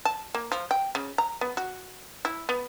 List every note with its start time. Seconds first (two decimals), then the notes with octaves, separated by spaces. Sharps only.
0.05 A5
0.34 A#3
0.52 F3
0.71 G5
0.95 C#3
1.18 A#5
1.41 B3
1.57 F#4
2.25 E4
2.49 B3